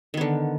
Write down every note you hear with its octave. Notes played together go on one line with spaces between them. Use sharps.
D3 D#3 B3